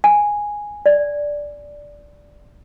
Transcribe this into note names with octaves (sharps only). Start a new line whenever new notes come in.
G#5
D5